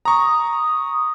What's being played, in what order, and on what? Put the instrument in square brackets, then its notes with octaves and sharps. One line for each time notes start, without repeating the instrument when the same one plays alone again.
[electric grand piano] A#5 C#6 [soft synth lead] D#6